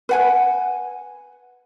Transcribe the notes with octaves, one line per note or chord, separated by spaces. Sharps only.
B4 F#5 G#5